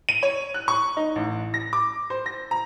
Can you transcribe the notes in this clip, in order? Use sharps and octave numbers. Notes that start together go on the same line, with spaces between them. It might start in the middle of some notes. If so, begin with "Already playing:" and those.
D#7
C#5
F#6
C#6
D#4
A1
A#6
D6
C5
A#6
A#5